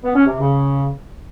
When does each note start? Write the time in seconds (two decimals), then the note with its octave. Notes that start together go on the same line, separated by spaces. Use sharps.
0.03 B3
0.14 C#4
0.26 C3
0.38 C#3